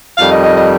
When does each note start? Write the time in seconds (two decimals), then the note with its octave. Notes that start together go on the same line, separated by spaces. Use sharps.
0.17 F2 D#3 G3 F5
0.31 D#5
0.43 D#5
0.57 D#5